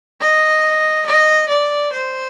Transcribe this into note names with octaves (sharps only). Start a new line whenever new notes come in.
D#5
D#5
D5
C5